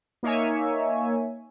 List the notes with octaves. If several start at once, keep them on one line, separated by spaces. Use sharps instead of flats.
A#3 D#4 C#5 E5 G#5